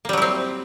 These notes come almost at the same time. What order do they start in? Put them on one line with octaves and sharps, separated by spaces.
A#3 G3 F#3 E4 C4